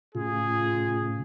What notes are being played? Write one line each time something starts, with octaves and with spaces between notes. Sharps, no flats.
A2 C#3 F4 G#4